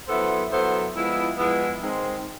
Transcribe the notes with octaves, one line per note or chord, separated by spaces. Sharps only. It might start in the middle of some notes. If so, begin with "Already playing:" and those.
F#3 B3 E4 A4 C5
F#3 B3 E4 A4 C5
F3 G#3 B3 E4
F3 G#3 B3 E4
D#3 G#3 C4